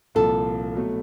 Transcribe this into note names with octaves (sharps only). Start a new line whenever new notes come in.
C2 A#2 F3 A4
B2 F#3 A3